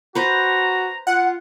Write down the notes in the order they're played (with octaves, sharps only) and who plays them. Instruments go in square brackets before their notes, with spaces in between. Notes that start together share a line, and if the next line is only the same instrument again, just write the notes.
[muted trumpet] F#4 [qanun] B4 C5 [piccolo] A#5
[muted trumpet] F4 [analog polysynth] F#5